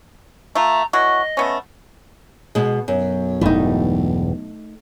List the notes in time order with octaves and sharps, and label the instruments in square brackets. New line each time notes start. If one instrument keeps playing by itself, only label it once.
[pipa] A3 F4 [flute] A#5
[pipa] E3 F#3 F#4 [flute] D#5
[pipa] A3 B3 C#4
[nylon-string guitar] B2 G#3
[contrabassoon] B1 [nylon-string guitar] F#2
[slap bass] E1 G2 E3 [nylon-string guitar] A3 D#4